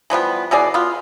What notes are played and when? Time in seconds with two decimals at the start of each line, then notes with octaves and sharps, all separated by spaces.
0.10 E3 F3 G3 B3
0.51 B2 E3 G#4 D5
0.74 B3 F4